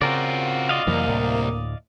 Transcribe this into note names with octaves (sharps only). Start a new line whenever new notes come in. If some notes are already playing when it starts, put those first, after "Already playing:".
C#3 C4 F4 F#4 A#4 D5
D5 D#5 F5
C2 F2 E3 F#3 A#3
D2 A2